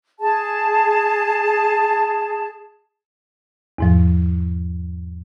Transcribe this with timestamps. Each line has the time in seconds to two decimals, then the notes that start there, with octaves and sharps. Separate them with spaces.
0.20 G#4 A5
3.78 E2 G#2 F3